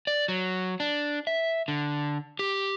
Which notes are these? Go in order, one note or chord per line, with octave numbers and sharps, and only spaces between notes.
D5
F#3
D4
E5
D3
G4